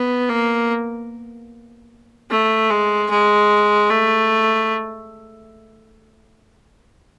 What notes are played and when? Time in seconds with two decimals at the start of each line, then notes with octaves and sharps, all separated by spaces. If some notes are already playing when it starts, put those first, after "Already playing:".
Already playing: B3
0.30 A#3
2.30 A3
2.70 G#3
3.10 G#3
3.90 A3